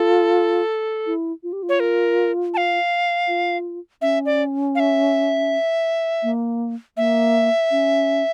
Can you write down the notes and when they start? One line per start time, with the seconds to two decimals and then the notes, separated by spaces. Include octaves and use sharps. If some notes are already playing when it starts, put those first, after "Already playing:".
Already playing: F4 A4
1.06 E4
1.43 F4
1.53 G4
1.63 F4
1.69 C#5
1.80 A#4
2.54 A5
2.57 F5
3.28 F4
4.02 C#4 E5
4.26 D5
4.75 F5
4.80 E5
6.23 A#3
6.97 A#3 E5
7.71 C#4